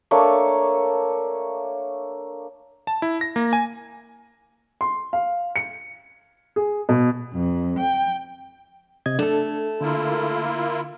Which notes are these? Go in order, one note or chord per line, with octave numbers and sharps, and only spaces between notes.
A3 A#3 D4 C#5
A5
E4
A#6
A#3
G#5
C6
F5
C#7
G#4
B2
F2
G5
C3 D#5 G#6
A3 D4 A4
D3 A#3 E4 F4